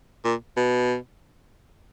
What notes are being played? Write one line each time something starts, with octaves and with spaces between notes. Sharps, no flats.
A#2
B2